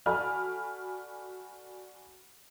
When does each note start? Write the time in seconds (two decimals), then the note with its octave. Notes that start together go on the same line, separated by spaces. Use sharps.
0.06 F#4 A4 D5 G#5 B5 F6